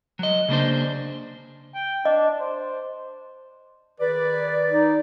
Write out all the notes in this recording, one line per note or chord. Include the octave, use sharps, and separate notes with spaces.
F#3 D#5
C#3 A#3 D4 C5
G5
D4 D#5
C5
D#3 G#4 B4 D5
D#4